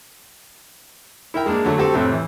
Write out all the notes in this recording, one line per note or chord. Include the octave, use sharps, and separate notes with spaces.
E4 A#4 G5
G#3 A#3 D4
D3 F#3 A3
G3 C4 F#4 G4 A4
F2 A2 C3 C4
E3